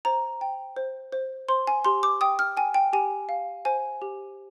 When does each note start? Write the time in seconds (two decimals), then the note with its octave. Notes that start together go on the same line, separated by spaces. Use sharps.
0.05 C5 A#5
0.41 G5
0.76 C5
1.12 C5
1.49 C5 C6
1.67 G#5
1.85 G4 C6
2.03 D6
2.21 G5 D#6
2.39 F6
2.57 G5 G#5
2.74 G5
2.93 G4 G#5
3.29 F5
3.65 C5 G#5
4.02 G4